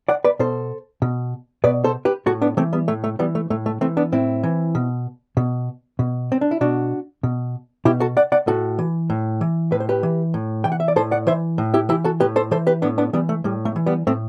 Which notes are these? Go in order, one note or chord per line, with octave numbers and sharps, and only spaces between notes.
D5 F#5
B4 D5
B2 A4 C5
B2
B2 B4 D5
A4 C5
G4 B4
A2 F#4 A4
B3 D4
E3 A3 C4
G3 B3
A2 A3
A3
E3 G3 B3
A3
A2 A3
A3
E3 A3 C4
B3 D4
A2 C4 E4
E3
B2
B2
B2
C4
D4
E4
B2 D4 F#4
B2
B2 E4 G4
F#4 A4
D5 F#5
D5 F#5
A2 F#4 A4
E3
A2
E3
A2 B4
C5
G4 B4
E3
A2
E3 G5
F#5
E5
D5
A2 A4 C5
D5 F#5
E3 C5 E5
A2
E4 G4
E3 E4 G4
F#4 A4
A2 G4 B4
A4 C5
E3 A4 C5
G4 B4
A2 B3 D4
B3 D4
E3 G3 B3
A3
A2 G3
A3
E3
G3 B3
A2 A3 C4